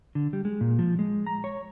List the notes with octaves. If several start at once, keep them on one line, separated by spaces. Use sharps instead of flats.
D3
G3
G#3
A#2
F3
G#3
A#5
C#5